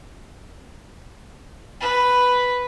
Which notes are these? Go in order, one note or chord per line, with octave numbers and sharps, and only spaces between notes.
B4